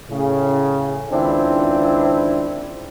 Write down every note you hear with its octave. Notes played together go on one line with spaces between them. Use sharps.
A2 C#3
C#2 D#3 C4 D4 E4